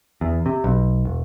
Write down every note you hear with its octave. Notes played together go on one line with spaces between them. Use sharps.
E2
C3
B1
E1